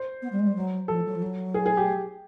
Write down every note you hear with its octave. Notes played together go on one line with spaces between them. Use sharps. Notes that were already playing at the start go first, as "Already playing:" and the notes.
Already playing: C5
B3
G3
G#3
G3
F#3
F3 A4
F#3
F3
F#3
G#4
G#4
G4